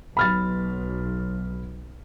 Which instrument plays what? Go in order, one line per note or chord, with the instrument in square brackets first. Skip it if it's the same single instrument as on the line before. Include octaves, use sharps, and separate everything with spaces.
[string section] B1 [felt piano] B5 F6 A6